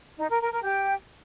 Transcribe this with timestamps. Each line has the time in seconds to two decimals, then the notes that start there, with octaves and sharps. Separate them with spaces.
0.19 D#4
0.30 A#4
0.41 A#4
0.52 A#4
0.63 G4